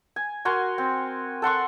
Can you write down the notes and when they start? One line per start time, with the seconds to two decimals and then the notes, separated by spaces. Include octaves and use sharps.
0.16 G#5
0.45 F#4 A#4 G#5 C6
0.78 C4
1.42 A4 F#5 C6 C#6